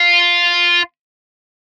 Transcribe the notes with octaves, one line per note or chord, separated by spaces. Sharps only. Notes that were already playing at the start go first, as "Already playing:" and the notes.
Already playing: F4